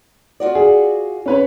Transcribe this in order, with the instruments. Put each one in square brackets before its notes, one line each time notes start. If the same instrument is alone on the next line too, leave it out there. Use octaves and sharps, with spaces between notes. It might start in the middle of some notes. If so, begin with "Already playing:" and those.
[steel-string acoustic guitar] F4 F#4 D5
[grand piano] G#4
C#4 B4 C#5